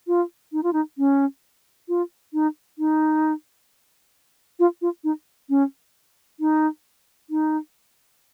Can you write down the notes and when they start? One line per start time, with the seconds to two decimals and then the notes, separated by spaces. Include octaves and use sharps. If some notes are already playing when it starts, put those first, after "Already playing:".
0.07 F4
0.53 D#4
0.63 F4
0.73 D#4
0.98 C#4
1.88 F4
2.33 D#4
2.79 D#4
4.59 F4
4.82 F4
5.04 D#4
5.49 C#4
6.40 D#4
7.30 D#4